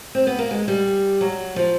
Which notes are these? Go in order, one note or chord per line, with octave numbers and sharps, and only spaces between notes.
C4
B3
A#3
G#3
G3
F#3
F3